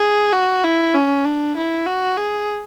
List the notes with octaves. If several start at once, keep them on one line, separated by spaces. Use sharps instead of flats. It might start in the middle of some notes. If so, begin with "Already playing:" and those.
Already playing: G#4
F#4
E4
C#4
D4
E4
F#4
G#4